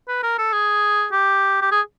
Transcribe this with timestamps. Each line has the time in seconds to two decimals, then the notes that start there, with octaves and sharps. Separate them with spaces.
0.08 B4
0.23 A#4
0.38 A4
0.52 G#4
1.12 G4
1.62 G4
1.71 G#4